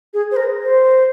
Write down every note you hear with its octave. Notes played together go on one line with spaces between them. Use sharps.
G#4
C5
A#4
C5